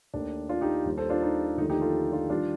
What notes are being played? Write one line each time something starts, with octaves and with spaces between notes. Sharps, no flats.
D#2 D#3 A3 D4
D4 F4
D#4 G4
D#2 D#3 G3
A4 C5
D4 F4
D#4
D#2 D3 F3 A3 D#4
D#4 G4
F4 A4
D4 F4
D#3 G3 D4 F4